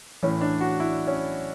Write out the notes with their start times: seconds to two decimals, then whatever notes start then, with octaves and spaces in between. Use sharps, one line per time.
0.23 A2 E3 C#4
0.41 D4
0.61 F#4
0.80 E4
1.07 C#4